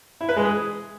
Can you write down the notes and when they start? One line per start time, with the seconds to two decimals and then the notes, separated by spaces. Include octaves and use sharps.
0.21 E4
0.29 B4
0.37 G#3
0.45 G#4